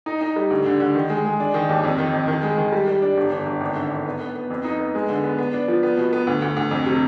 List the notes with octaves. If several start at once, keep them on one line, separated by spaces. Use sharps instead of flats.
D#4
D#4
G3
D2
D3
D3
D#3
G#3
G#3
D4
D#3
D#2
F2
D#3
F2
D#3
G#3
D#3
G3
G3
D4
G1
G1
G1
G#1
D3
G#1
B3
B3
B3
F2
D#4
B3
G#3
D3
B3
B3
D4
F3
B3
B2
B3
D2
D2
D2
F2
C3